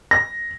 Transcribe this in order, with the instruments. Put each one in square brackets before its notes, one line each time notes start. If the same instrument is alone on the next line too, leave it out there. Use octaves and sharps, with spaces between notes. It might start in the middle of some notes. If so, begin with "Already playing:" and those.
[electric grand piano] A#6